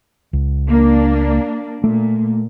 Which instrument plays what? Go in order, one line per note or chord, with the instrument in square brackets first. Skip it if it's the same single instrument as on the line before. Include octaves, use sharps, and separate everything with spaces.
[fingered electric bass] C#2
[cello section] A#3 D4
[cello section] A#2 [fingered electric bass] A3